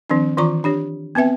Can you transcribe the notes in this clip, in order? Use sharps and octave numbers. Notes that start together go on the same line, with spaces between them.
D#3 F3 C4 D4
D#3 E3 F4 D5 A#5 C#6
D4 G4 C#5
B3 C4 B4 E5 G5